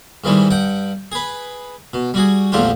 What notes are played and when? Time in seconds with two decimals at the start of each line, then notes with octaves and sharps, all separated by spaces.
0.24 G#2 D#3 E3 G3 G#3
0.50 G2 F#5 G5
1.12 G#4 B4
1.94 B2
2.14 G3 F#4 G#4
2.52 A#1 E2 F3 A3 F4 G4